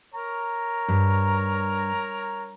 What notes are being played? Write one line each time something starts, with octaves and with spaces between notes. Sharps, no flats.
A#4 C#5 A#5
G2